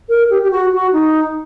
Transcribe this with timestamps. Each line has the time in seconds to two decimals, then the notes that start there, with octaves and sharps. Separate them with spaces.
0.09 A#4
0.30 G4
0.42 G4
0.51 F#4
0.73 F#4
0.93 D#4